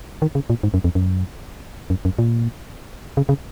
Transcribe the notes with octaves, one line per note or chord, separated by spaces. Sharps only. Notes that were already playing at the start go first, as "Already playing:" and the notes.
D#3
C#3
A#2
G#2
F#2
F2
F#2
F#2
F#2
A#2
C#3
C#3